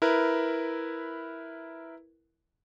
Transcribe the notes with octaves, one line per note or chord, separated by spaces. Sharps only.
E4 A#4 B4